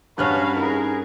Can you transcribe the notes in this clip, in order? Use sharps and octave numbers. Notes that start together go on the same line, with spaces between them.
G2 C#4 F#4 B4 F5 A5 F6 F#6
D#4 G#4 A#4